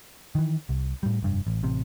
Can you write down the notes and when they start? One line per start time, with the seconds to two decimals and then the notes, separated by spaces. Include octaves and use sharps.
0.35 D#3 E3
0.69 C2
1.03 A2 G3
1.22 F1 G2
1.47 A1
1.63 A1 C3